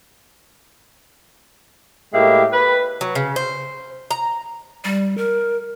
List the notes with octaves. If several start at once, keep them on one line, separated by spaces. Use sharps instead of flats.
A2 G#3 A#3 G4 E5
B4
F#3
C#3
C5
A#5
G3
A#4